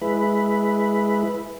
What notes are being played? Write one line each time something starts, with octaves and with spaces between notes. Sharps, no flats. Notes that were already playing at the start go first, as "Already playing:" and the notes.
G#3 E4 B4